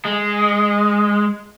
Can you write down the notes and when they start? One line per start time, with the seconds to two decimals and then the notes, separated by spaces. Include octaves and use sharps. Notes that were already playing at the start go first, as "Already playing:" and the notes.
0.05 G#3